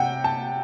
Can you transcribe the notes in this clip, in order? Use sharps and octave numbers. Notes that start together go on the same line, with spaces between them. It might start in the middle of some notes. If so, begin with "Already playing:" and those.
Already playing: C3 F#5 G5
A5